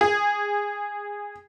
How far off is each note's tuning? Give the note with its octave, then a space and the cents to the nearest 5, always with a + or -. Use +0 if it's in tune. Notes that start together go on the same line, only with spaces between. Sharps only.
G#4 -20